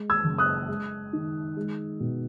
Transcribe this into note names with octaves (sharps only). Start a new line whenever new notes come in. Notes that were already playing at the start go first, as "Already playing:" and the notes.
Already playing: G#3
E6 G#6
F#1
D#6 F#6
G#3
D#3
G#3
B2